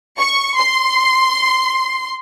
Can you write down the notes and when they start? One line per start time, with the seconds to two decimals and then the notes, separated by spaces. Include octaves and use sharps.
0.18 C#6
0.58 C6